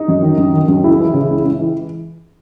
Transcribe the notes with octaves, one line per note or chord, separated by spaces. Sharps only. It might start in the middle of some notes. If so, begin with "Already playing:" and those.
Already playing: D#4
F#2
D#3
F#2
D#3
F#2
C#2 E4
E3
C#3
C#2
C#2
E3